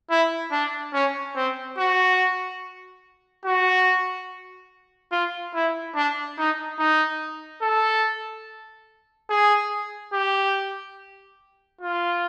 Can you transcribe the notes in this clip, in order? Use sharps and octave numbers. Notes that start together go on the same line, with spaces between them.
E4
D4
C#4
C4
F#4
F#4
F4
E4
D4
D#4
D#4
A4
G#4
G4
F4